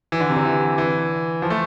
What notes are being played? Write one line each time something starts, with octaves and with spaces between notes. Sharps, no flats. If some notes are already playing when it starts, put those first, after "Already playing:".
E3
D3
C3
D3
E3
E3
F3
A3